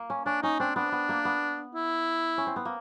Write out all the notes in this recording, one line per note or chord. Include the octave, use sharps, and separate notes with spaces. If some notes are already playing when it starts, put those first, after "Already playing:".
Already playing: A#3
C#4
C#4 D4
C#4 D#4
C4 D4
B3 D4
B3
A#3
B3
E4
C#4
C4
B3
A#3